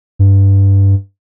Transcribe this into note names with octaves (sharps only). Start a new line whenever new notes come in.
G2